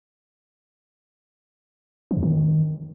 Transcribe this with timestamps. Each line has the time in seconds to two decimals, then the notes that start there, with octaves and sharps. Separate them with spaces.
2.11 E3
2.17 E2
2.23 D#3